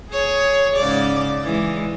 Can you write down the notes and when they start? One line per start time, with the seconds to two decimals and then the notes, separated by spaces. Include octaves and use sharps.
0.11 G#4 C#5
0.76 G#2 C#3 D5
1.43 E3 G#3